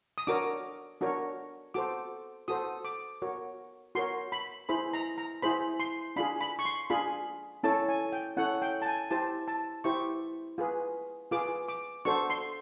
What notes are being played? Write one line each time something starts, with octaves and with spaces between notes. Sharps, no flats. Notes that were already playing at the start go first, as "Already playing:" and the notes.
D#6
D4 F#4 A#4 C#5 D6
D4 F#4 A#4 C#5
F#4 A4 C5 D6
F#4 A4 C5 D#6
D6
F#4 A#4 C#5
F#4 A#4 C#5 C6
B5
E4 G#4 C5 B5
A#5
A#5
E4 G#4 C5 B5
C6
D4 F4 G#4 B5
B5
C#6
C6
D4 F4 G#4 B5
C#4 E4 A4 C#5 A5
G#5
G5
C#4 E4 A4 C#5 F#5
G5
A5
G#5
E4 G4 C5 A5
A5
E4 G4 C5 C#6
F4 G#4 B4
F4 G#4 B4 D6
D6
D4 F#4 A4 C5 C#6
C6